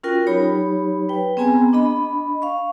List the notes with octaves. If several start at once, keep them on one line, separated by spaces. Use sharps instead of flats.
C#4 F4 F#4 A#4 G5
F#3 D#4 G4 C#5 B5
B4 G5
B3 C4 G#4 G#5 A#5
D4 D#5 B5
F5 C#6